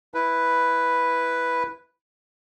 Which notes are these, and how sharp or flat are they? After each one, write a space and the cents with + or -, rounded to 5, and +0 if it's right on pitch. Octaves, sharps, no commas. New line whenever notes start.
E4 +0 B4 +0